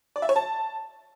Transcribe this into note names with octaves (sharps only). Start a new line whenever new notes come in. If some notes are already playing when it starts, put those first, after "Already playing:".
D5
E5
C#5
A5